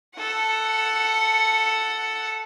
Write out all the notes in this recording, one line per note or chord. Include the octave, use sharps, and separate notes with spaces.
A4 F#5